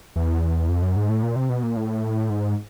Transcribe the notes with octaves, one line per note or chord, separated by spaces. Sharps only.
E2
F2
F#2
G#2
A2
A#2
C3
B2
A#2
A2
G#2